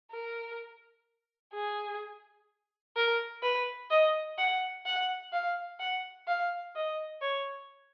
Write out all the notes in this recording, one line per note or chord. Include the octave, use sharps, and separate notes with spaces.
A#4
G#4
A#4
B4
D#5
F#5
F#5
F5
F#5
F5
D#5
C#5